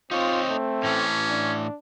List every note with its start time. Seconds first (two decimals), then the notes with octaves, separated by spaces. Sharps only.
0.11 C4 D#4 F4 C#5
0.49 A3
0.83 A2 E3 C#4
1.30 D4